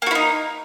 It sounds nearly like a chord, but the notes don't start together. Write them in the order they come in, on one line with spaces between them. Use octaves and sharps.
A#3 F#4 E4 D#4